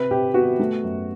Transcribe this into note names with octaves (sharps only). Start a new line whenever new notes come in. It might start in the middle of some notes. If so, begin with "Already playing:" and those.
Already playing: C3 B4
C3 G4
B3 F#4
A3
F#2